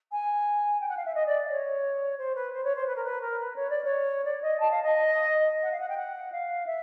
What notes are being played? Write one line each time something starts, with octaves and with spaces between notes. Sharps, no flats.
G#5
G5
F#5
F5
E5
D#5
D5
C#5
C5
B4
C5
C#5
C5
B4
A#4
B4
A#4
B4
C#5
D5
C#5
D5
D#5
A5
F5
D#5
F#5
F5
F#5
G5
F#5
F5
E5